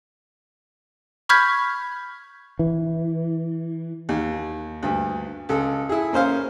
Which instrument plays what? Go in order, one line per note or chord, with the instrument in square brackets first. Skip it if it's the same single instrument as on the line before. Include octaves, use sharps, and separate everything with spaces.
[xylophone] B5 C#6 F6 G6 G#6 B6
[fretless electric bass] E3
[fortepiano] D#2
D2 G2
C#2 A4
E4 G#4
A#3 C#4 C5 F5